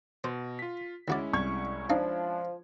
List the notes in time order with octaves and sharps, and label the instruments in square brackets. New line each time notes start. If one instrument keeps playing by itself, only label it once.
[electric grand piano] B2 [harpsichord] C5
[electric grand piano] F4 B6
[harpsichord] D2 F#4 D5 [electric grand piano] G#3 C#4 E4
[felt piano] C2 C#6 G#6
[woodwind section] F3 [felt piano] D4 [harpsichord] D#4 F5